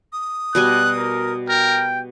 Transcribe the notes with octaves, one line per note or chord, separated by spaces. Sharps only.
D#6
B2 G3 G#5 F#6
A#4
A#4 G5